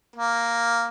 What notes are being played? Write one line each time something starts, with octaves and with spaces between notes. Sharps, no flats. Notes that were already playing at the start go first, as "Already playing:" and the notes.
A#3